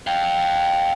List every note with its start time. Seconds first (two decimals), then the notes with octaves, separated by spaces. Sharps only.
0.07 F5 G5